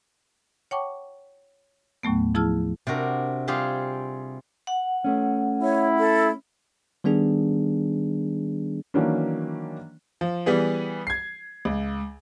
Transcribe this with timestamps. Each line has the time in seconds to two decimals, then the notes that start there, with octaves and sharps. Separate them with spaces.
0.71 C#5 F#5 G5 A5 C#6 D6
2.03 D#2 A2 F#3 A3 B3
2.35 F3 E4 G#4 A5 E6 F6
2.87 C3 D4 F#4 A#4
3.47 G3 C4 F4 G4 G#4 F5
4.67 F#5
5.04 A3 C#4
5.62 E4 C#5
5.98 A4
7.04 D#3 G3 B3 D4 G#4
8.94 D#3 E3 F#3 A#3 C#4 D4
10.21 F3
10.46 E3 G3 B3 G#4
11.07 G#6 C7
11.65 C#2